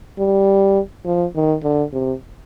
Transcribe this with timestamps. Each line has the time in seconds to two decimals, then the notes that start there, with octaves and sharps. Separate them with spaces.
0.19 G3
1.05 F3
1.35 D#3
1.63 D3
1.92 C3